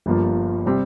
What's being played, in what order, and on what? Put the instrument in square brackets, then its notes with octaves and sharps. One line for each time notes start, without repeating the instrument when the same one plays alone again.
[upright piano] G1 G2 F3 A#3 F4
C3 G3 C4